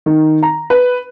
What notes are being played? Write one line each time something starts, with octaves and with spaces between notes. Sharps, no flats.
D#3
A#5
B4